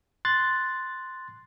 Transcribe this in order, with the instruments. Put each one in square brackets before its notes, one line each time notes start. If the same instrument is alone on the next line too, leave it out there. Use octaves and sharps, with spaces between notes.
[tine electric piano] C6 F#6 A6